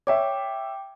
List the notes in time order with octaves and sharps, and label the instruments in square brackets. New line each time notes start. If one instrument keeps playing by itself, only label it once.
[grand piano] C#5 E5 [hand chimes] G5 D6